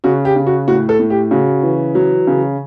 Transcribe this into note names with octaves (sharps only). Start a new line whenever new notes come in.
C#3 F#4
G4
C#3
F#4
A2 F#4
A4
A2
G4
C#3 F#4
E3
F#3
C#3